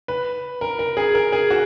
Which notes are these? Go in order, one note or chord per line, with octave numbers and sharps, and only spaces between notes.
B4
A#4
A#4
G#4
A#4
G#4
F#4